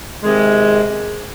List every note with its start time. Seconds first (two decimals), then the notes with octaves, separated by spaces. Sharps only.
0.23 C3 D#3 G#3